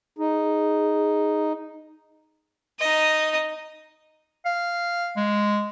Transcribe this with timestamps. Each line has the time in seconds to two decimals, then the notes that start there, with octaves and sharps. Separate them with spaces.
0.19 D#4 G#4
2.80 D#4 D#5
4.45 F5
5.16 G#3